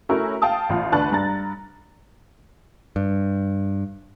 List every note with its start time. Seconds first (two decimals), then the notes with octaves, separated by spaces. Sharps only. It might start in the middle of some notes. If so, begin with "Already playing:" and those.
0.09 A3 C#4 E4 F#4 A#4
0.42 F5 G5 A5 D#6
0.69 A1 F4
0.92 D2 D4 B4 A5 C#6 F#6
1.11 G2 A#5 A6
2.96 G2